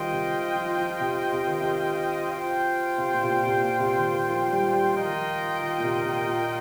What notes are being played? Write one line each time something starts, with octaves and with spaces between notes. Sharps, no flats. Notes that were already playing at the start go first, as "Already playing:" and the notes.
Already playing: D#3 G3 F4 C5 D#5 G5
C3
D#3
F3
F3
C3
C3
D#3
C3
F4 C5 G5
C3
A#2
C3
A#2
C3
A#2
C3
D#3
D#3
F3
G3
G3
F3 F4 A#4 D#5 G5
D#3
F3
D#3
A#2
C3
C3
A#2